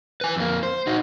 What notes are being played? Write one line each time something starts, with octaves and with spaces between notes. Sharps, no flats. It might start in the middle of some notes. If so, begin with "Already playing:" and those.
B4 G#5
F2 A#3
C5
D#4 F#4